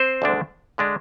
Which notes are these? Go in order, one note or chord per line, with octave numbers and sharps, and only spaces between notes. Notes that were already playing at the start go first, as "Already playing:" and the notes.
Already playing: C4 C5
D2 D3 G#3 D4
D3 G#3 D4